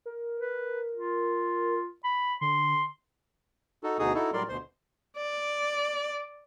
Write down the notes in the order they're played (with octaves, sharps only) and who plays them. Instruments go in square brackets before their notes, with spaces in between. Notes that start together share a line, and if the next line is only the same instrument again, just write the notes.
[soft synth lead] A#4
[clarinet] B4
F4
B5
[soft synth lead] D3 [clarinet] C6
[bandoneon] D#4 F#4 A4
D2 B2 D#4 F#4 G#4 D#6
D#4 E4 F#4 A4
A2 F#3 G3 A#4 D5 C6
D2 B2 C5 C6
[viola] D5